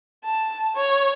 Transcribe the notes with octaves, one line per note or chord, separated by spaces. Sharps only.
A5
C#5